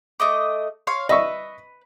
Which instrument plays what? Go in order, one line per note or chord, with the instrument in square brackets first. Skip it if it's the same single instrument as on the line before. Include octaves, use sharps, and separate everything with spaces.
[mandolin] A3 D#5 D6
C#5 F5 C6
[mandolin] B4 [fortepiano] D#5 E5 C#6